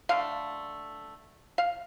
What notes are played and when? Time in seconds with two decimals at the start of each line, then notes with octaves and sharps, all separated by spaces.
0.09 D3 A3 F5
1.58 F5